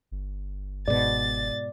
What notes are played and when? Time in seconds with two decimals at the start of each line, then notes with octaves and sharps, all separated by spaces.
0.11 G1
0.88 G#2 B2 D5 A6